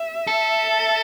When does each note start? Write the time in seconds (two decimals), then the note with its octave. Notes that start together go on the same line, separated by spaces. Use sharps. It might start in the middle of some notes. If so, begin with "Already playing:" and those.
Already playing: E5
0.27 A4